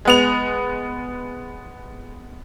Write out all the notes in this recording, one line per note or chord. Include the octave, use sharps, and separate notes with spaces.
G#3 B3 F7